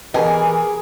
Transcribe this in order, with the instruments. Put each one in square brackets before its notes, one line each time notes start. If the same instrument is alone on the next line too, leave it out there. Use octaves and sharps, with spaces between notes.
[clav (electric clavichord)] B2 [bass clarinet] E3 [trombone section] G4 A#4 [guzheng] G#4